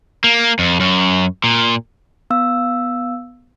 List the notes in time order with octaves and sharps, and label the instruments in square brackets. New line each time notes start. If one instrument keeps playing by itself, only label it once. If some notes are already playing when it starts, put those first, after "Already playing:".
[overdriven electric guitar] A#3
F2
F#2
A#2
[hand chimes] B3 F5 E6